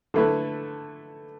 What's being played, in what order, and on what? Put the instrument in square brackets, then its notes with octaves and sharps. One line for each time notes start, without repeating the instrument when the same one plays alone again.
[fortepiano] D3 A3 E4 B4